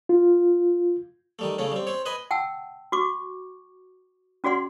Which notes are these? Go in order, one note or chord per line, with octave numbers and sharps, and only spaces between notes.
F4
D#3 G3 A3
C#3 A3 C#4
G3 C4
C4 C#5
B4 D#5 G#5 B5
F#5 G5 A5 E6
F#4 C#6 D6
C#4 F#4 G#4 D5 F#5 C6